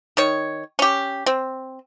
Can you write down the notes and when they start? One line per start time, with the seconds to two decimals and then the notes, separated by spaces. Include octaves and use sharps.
0.17 D#3 C#5
0.79 C#4 G4
1.26 C4